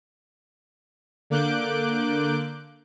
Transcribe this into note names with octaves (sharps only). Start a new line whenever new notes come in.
D3 A#3 D6 F#6 G6 D7